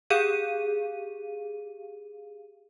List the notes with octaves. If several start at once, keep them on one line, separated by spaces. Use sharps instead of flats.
G4 G#4 F5 D#7